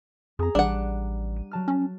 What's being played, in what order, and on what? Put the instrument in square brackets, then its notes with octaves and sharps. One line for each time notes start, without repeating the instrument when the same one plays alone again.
[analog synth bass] F2 [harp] G#4 A#5
[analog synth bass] A1 [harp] G3 [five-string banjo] D4 F#5
[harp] D#7
F#3 A5 F6
[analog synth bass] C#4